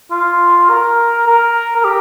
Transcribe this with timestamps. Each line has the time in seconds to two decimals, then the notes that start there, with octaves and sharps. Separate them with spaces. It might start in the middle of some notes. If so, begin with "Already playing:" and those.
0.11 F4
0.69 A#4
1.27 A#4
1.76 A#4
1.84 G4